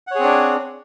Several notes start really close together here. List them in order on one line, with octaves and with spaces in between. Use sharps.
F#5 C#5 G#4 C4 D4